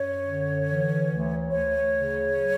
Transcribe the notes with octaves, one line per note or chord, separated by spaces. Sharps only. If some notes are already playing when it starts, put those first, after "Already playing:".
Already playing: F#2 C#5
D3
E3
D2
D2 C#5
C#3
F#3